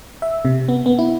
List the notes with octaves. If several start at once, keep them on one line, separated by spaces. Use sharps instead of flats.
E5
C3
B3
B3
E4